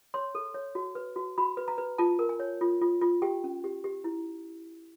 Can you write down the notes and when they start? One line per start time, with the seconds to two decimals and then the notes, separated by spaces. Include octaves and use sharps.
0.14 C#5 C6
0.35 A4
0.54 C#5
0.75 F#4
0.95 B4
1.16 F#4
1.38 F#4 B5
1.57 B4
1.68 A#5
1.78 B4
1.98 F4 A5
2.19 A#4
2.29 G#5
2.40 C#5
2.61 F4
2.81 F4
3.01 F4
3.22 G4 G5
3.44 C#4
3.64 G4
3.84 G4
4.04 E4